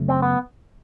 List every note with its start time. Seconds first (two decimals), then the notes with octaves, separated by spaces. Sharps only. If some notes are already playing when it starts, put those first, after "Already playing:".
Already playing: F#2 C#3 F#3 A3
0.08 C4
0.22 B3